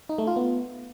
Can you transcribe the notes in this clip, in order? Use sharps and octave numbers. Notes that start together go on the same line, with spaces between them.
D#4
A3
F4
B3